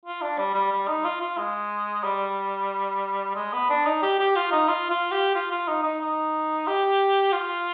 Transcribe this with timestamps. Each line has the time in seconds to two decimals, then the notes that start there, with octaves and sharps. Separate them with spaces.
0.05 F4
0.21 D4
0.38 G3
0.54 G3
0.72 G3
0.88 D#4
1.05 F4
1.21 F4
1.38 G#3
2.04 G3
3.35 G#3
3.53 B3
3.70 D4
3.85 D#4
4.02 G4
4.19 G4
4.36 F4
4.52 D#4
4.68 F4
4.90 F4
5.12 G4
5.35 F4
5.51 F4
5.68 D#4
5.83 D#4
6.01 D#4
6.67 G4
7.32 F4